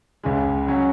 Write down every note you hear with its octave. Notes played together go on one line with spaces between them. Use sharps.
C#2 C#3 G#3
C#3 F#3 C#4